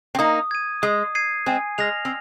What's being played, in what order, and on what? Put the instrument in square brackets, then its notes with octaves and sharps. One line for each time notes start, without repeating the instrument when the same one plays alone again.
[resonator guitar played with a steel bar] C4
[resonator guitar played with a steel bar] A#3 D#4 [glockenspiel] D#6
[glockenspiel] G#6 D#7
[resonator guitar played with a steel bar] G#3 [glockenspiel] D#6
[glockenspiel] G#6 C7 D#7
[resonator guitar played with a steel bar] G#3 C4 [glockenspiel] G#5
[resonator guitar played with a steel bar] G#3 [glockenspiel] F6 A#6 F7
[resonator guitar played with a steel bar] C4